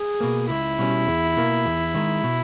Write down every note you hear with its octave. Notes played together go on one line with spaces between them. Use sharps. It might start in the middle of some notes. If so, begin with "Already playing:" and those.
Already playing: G#4
B2 A#3
C#2 E4
B2 G3 C#4
E2
B2 A#3
E2
D#3 G#3
B2